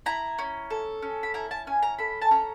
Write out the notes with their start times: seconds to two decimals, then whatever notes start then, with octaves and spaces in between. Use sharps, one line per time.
0.06 E4 A#5
0.39 C#4
0.70 A4
1.02 C#4
1.23 B5
1.34 E4 A#5
1.51 A5
1.67 C#4 G#5
1.83 A#5
1.99 A4 B5
2.22 A5
2.31 C#4 A#5